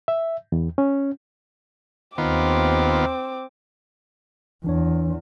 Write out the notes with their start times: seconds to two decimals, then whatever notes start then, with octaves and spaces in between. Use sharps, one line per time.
0.08 E5
0.52 E2
0.78 C#4
2.18 D#2 D#3 B3 C4 F4 D6
4.64 E2 E3 D4 C#5